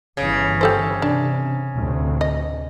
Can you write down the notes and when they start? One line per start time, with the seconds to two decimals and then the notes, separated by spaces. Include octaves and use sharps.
0.17 G1 C#3 E3
0.61 G3 A4 C5
1.02 C3 D4
1.75 D2 A2 C3
2.21 D#5